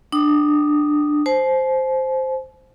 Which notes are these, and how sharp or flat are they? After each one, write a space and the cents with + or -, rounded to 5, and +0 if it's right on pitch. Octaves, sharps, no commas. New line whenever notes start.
D4 +15 G5 -25 D#6 +0
C5 +0 A5 -45